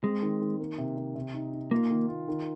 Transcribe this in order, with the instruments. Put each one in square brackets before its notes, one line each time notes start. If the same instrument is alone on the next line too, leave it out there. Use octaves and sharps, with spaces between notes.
[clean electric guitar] G#3 [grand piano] C4
[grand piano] D#3
D#3
A#3
C3
C3
C3
D#4
D#4
[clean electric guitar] A#3 [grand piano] F4
[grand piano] D#3
F4
D#3